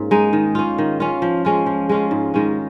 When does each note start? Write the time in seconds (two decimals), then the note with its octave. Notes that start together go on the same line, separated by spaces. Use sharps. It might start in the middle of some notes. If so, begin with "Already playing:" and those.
Already playing: G#2 A#3 C#4 F4
0.11 G#3 D#4
0.33 D#3
0.55 C#4 F4
0.78 D#3
1.00 C#4 F4
1.22 F3
1.45 G#3 C#4 F4
1.66 F3
1.89 G#3 C#4 F4
2.11 G#2
2.34 D#3 G#3 C#4